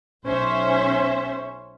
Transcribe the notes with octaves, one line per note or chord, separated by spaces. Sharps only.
B1 C#4 C5 E5